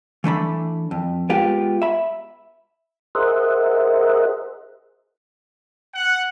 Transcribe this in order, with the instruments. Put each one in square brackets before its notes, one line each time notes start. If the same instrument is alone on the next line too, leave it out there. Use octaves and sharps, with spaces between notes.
[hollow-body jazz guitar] E3 A3 D4 B5
F2
G#3 B3 F4 G4
E5 B5
[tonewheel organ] G#4 A#4 C5 D#5 E5 F#5
[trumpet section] F#5